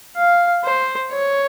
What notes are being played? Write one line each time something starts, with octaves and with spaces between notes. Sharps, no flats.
F5
C5
C#5